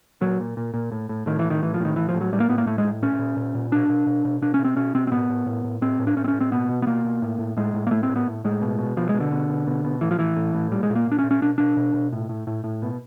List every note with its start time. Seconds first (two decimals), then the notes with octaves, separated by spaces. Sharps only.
0.21 A#2 F#3
0.40 A#2
0.57 A#2
0.74 A#2
0.92 A2
1.09 A2
1.26 A2 D#3
1.39 E3
1.44 A2
1.50 D#3
1.62 A2 E3
1.74 F3
1.80 A2
1.85 D#3
1.96 A2 E3
2.09 F3
2.14 A2
2.21 F#3
2.32 A2 G3
2.40 A#3
2.49 A2 B3
2.58 A#3
2.66 A2 A3
2.78 G#3
2.84 A2
3.02 A#2 C#4
3.19 A#2
3.37 A#2
3.55 A#2
3.72 B2 D4
3.90 B2
4.06 B2
4.25 B2
4.41 B2 D4
4.54 C#4
4.59 B2
4.64 C4
4.76 B2 C#4
4.94 B2 C4
5.07 C4
5.12 A2 B3
5.30 A2
5.46 A2
5.64 A2
5.81 A2 C4
5.99 A2
6.07 D4
6.16 A2 C#4
6.24 C4
6.28 C#4
6.34 A2
6.41 C4
6.51 B2 B3
6.69 B2
6.82 B3
6.87 B2 A#3
7.04 B2
7.22 A2
7.39 A2
7.57 A2 G#3
7.74 A2
7.87 A#3
7.91 A2 A3
8.03 C4
8.09 A2
8.16 B3
8.27 A2
8.44 A2 G#3
8.62 B2
8.79 B2
8.97 B2 F3
9.09 G#3
9.14 B2
9.20 D3
9.31 B2
9.49 B2
9.67 B2
9.84 B2
10.01 A2 E3
10.11 F3
10.19 A2 E3
10.37 A2
10.54 A2
10.71 A#2 G3
10.83 G#3
10.90 A#2
10.95 A#3
11.07 A#2 D4
11.19 C#4
11.24 A#2
11.31 C#4
11.42 B2 D4
11.58 B2 D4
11.77 B2
11.94 B2
12.12 A2
12.29 A2
12.47 A2
12.64 A2
12.82 B2